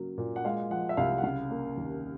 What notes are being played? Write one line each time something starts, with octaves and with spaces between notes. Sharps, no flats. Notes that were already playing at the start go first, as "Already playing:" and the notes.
Already playing: C#3 F#3 A#3
A#2
F#5
G#3 F5
F3 F#5
E5
C2 F5
F#5
C#3 F5
A#3
D#2